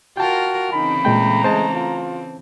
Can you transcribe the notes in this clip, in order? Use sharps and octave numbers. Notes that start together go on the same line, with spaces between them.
F4 F#4 A#4 G5 A5
C#3 E3 C4 D#4 B5
A#2 G#3 A3 G5 A#5
G#3 C5 A5
F4